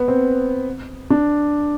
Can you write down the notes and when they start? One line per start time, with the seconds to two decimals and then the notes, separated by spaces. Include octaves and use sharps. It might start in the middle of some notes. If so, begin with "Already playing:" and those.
Already playing: B3
0.08 C4
1.10 D4